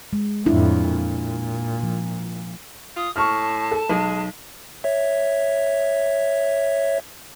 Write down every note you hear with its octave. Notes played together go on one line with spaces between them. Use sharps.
G#3
F2 A2 D4 E4
A#2
F3
F4 D#6
A2 A5 C#6 F6
A4
B1 G#3
C#5 E5